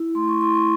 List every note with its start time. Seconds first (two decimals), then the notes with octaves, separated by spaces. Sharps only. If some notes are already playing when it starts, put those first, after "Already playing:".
Already playing: E4
0.15 A3 C6
0.28 C#6
0.41 E4 C6
0.55 C#6